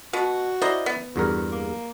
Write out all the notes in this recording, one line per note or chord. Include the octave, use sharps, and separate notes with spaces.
B2 F#4
E4 C5 D5 D#5 A#5
B3
E2 G2 F#4 A#4
A#3